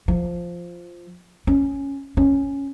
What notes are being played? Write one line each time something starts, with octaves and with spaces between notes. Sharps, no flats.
F3
C#4
C#4